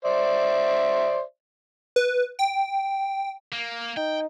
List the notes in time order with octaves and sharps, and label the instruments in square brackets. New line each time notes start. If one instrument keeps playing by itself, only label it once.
[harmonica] C5 D5 E5
[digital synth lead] B4
G5
[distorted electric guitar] A#3
[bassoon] D#4 [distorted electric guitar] G5